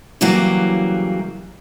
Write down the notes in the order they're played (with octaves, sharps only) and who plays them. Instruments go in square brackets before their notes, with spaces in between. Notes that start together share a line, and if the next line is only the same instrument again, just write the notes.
[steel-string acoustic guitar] C#3 E3 F#3 G3 A#3